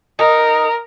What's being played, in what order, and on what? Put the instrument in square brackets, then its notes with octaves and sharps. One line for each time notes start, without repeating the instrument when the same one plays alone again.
[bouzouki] D#4 [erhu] A#4